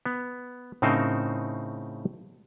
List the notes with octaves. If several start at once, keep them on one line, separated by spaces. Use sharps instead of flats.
B3
A2 C#3 C4 D#4 A#4 C5